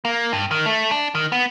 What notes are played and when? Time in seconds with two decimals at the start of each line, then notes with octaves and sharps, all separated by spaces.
0.05 A#3
0.33 G2
0.51 D#3
0.66 A3
0.91 D4
1.15 D#3
1.32 B3